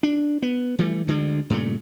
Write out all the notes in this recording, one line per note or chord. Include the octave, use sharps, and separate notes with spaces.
D4
B3
E3 G3 A3
D2 D3 G#3
G2 A#2 C#3 A3